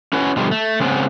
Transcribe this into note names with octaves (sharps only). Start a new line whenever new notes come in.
C#4 E4 F#4 B4 C#5
B2 D3 F3 G3
A3
C#3 G#3 B3 C4